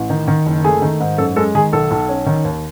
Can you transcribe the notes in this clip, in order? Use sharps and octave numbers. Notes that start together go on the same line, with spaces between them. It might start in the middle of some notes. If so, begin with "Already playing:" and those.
Already playing: A1
D#3
D#3
F#1
A3 G#4
D#3
G#2
F#2 A4
G#3 A4
D#3 G#4
B1 A4
B1
C#4
D#3
D#2